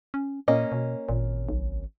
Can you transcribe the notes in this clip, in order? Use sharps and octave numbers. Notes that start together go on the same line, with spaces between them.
C#4
A#2 A#3 C#4 D#5
B2
G#1 A#2
B1